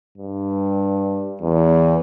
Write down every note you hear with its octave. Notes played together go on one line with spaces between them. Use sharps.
G2
E2